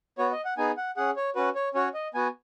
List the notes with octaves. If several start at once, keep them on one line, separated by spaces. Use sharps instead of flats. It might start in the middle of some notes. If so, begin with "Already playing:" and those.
B3 F#4 C#5
D#5
F#5
B3 D#4 G#4 G#5
F#5
C#4 G#4 F#5
C#5
C#4 F#4 B4
C#5
C#4 F#4 C#5
D#5
B3 F#4 G#5